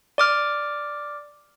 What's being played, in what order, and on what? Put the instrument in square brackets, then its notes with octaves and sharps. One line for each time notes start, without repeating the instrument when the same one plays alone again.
[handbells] D5 D6 F6